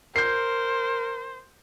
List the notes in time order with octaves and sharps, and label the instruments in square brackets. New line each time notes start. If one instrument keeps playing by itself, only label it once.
[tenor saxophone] A#4 [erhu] C5 [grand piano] G6 C7